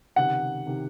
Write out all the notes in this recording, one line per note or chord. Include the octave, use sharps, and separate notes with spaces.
C#2 C3 D#3 F#5
C3 D#3